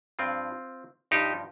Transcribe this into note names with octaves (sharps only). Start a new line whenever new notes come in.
G2 F3 C4 F4
G2 F3 D#4 G4